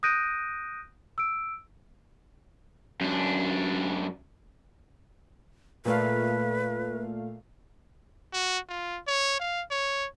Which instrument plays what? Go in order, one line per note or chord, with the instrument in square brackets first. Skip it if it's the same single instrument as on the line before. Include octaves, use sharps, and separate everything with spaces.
[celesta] D#6 F#6 G6 A#6 D7 D#7
E6 D7
[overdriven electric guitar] F#2 D4
[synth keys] A#2 A3 F5 [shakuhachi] B4
[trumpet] F#4
F4
C#5
F5
C#5